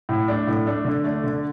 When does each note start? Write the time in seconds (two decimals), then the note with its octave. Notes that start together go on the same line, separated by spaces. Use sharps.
0.09 A2
0.28 A3 D4
0.47 A2
0.66 A3 D4
0.84 D3
1.04 A3 D4
1.24 D3